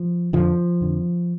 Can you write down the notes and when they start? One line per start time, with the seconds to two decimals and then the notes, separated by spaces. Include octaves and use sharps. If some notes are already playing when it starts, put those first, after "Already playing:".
Already playing: F3
0.33 F2 D3 F3
0.81 F2 D3